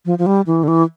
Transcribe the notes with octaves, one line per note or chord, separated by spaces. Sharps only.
F3
F3
G3
E3
D3
E3